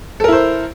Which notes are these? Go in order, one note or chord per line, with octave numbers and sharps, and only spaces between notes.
E4 A4 A#4 C5